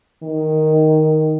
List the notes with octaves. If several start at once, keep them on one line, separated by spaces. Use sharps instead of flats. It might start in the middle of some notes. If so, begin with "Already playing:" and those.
D#3